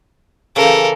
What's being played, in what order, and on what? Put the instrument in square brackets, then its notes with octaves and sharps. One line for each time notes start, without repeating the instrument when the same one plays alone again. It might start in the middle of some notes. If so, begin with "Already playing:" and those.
[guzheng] C#3 E3 [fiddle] A4 A#4